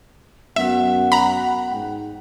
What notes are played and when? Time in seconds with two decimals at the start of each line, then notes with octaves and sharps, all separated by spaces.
0.56 F#2 A3 B3 F#4 E5 F#5
1.12 A#5 B5
1.71 G#2 G5